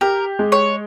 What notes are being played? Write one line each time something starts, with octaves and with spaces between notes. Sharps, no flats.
G4 A#4
G#3
C#5